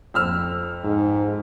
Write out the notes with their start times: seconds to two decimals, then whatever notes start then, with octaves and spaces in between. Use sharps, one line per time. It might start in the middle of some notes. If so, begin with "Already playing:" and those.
0.14 F2 E6 F6
0.84 G#2